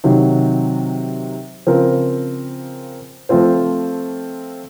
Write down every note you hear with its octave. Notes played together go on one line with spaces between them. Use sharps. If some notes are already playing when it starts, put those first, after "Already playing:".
C3 D#3 F#3
C#3 F3 C4 F4 A#4
F3 A3 C4 F4 C5